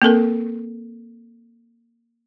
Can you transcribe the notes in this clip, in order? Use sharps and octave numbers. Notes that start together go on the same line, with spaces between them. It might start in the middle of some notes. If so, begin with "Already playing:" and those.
A#3 C4 A4 A#4